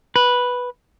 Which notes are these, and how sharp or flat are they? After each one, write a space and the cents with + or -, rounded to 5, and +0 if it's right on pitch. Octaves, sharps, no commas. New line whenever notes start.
B4 -5